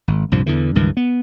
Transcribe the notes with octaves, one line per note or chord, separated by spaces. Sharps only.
G#1
C2 G2 A#2 F3
E2 D3 E3
C#2 G2 D#3 E3
B3